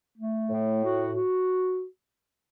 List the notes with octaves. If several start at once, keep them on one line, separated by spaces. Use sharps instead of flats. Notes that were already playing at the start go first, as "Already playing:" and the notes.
A3
A2
F#4
F#4